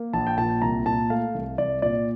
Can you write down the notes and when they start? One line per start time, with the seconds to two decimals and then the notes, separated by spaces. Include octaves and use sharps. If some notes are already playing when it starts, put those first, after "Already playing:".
Already playing: A#3
0.13 A#1 A5
0.27 G5
0.38 A#2 A5
0.62 C2 A#5
0.86 A#2 A5
1.10 A3 F5
1.34 C2
1.58 C2 D5
1.82 A#2 D5